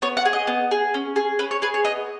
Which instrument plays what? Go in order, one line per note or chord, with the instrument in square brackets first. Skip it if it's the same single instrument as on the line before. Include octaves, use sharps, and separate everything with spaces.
[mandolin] B3 C#5
F#5
G#4
D#5
B3
G#4
C#4
G#4
C#4 B4
C#5
G#4 B4
C#5
B3 D#5